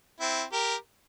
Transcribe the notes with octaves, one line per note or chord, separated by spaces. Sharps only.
C4 E4
G4 A#4